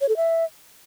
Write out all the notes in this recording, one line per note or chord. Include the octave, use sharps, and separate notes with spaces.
C#5
A4
E5